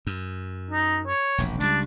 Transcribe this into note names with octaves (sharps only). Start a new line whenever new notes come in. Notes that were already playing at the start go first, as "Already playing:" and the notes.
F#2
D#4
C#5
E1 A#1
C#2 G3 D4